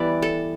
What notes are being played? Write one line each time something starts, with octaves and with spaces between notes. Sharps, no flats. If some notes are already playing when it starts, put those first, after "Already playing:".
Already playing: E3 G3 B3 E4 D5
A4